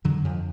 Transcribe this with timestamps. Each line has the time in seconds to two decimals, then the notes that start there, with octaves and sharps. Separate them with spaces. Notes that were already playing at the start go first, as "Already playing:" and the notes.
0.04 F2 D3 F#3
0.24 F2 F3